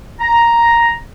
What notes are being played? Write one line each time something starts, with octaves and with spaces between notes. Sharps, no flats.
A#5